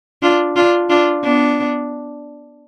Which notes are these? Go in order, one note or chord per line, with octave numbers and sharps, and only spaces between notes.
D4 F4
D4 F4
D4 F4
B3 D4